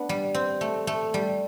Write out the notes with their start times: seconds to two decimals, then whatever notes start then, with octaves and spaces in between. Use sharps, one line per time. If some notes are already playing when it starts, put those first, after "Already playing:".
Already playing: B3 D4
0.09 G3
0.34 C4
0.61 A3
0.87 A3
1.14 G3